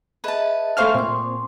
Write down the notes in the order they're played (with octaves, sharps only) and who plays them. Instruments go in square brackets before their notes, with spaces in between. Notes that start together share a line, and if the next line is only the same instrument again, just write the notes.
[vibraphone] G#4 D#5 E5 [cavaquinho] B4 A5
[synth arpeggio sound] A3 C5 F6 [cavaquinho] G#4 F5 C#6 [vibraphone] E5
[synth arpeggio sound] A#2 C4 [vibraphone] C6 D6